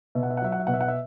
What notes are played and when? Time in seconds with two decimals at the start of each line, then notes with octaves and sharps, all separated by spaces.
0.15 B2 E5
0.23 F#5
0.30 E5
0.37 F#5
0.41 F#3 E5
0.52 F#5
0.59 E5
0.67 B2 F#5
0.74 E5
0.81 F#5
0.88 E5